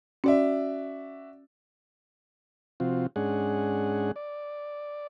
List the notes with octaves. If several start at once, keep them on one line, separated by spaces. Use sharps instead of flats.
C#4 F#4 D5 E5
C3 F3 C4 F4 F#4
G#2 G#3 C#4 D4 G#4 F#5
D5